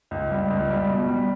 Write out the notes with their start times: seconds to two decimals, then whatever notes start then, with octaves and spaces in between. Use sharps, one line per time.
0.11 C#2
0.31 G3
0.50 C#2
0.70 G3
0.90 B2
1.09 G3